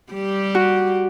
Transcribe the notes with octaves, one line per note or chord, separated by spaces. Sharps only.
G3 G4
F#4